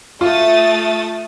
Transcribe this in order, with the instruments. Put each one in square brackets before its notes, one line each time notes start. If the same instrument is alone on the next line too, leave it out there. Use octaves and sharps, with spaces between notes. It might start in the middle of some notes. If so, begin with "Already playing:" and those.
[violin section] A3 D#6 A6 [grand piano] F4